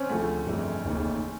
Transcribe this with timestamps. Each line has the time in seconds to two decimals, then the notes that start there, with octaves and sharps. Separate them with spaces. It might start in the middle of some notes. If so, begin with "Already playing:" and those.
Already playing: C4 C#4
0.09 D2 C#3 F3 A3
0.47 G1 F2 C#3 E3
0.85 F1 D#2 C#3 E3